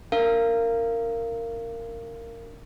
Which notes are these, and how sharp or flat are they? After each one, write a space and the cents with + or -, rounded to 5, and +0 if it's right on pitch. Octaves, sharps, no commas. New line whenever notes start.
D4 +0 A#4 -15 F5 -25